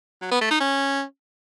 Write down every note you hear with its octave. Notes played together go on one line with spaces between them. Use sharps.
F#3
B3
A3
D#4
C#4